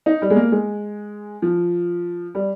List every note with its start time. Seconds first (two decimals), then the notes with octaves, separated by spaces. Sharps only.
0.06 D#4
0.22 G3
0.30 G#3
0.36 A#3
0.52 G#3
1.42 F3
2.35 G3